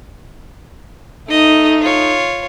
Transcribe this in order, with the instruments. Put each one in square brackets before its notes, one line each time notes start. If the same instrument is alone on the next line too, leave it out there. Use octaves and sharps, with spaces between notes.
[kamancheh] A3 D#4 [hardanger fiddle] D#5
[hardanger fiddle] F4 C#5